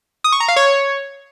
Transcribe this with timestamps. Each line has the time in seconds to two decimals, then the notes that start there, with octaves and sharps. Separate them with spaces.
0.24 D#6
0.32 C#6
0.40 A#5
0.48 F5
0.56 C#5